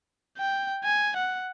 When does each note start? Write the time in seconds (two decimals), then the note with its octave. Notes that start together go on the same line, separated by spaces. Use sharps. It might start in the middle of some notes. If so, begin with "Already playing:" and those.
0.38 G5
0.84 G#5
1.17 F#5